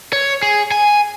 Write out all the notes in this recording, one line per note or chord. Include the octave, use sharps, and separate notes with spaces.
C#5
G#4
G#5